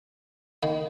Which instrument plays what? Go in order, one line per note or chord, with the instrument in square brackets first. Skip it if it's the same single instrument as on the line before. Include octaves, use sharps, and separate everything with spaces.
[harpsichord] D#3 A#3